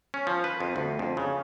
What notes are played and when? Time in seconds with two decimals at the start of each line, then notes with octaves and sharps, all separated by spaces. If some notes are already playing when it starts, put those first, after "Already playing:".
0.14 C#4
0.27 F3
0.44 B4
0.60 F2
0.76 D2
0.99 F2
1.17 C#3